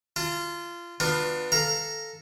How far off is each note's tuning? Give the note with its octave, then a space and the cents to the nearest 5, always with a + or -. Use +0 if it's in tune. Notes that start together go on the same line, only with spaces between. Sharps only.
F4 -20 A5 +20
B3 +0 D4 +30 F4 +15
A4 +0 F5 +0 A#5 +0